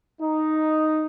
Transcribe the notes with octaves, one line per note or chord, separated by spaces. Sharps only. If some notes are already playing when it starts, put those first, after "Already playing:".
D#4